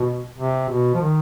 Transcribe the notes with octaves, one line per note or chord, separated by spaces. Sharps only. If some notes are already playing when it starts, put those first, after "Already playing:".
Already playing: B2
C3
B2
F3
D#3